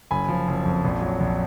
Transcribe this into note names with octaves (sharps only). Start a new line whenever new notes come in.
F#1 G#5 B5
F3
F#1
F2
A#1
F#3
A#1